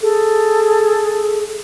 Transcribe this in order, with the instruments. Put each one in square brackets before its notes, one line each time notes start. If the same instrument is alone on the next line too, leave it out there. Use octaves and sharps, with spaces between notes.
[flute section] G#4 A4